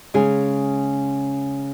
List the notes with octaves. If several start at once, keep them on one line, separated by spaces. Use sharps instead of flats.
C#3 G#3 C#4 G#4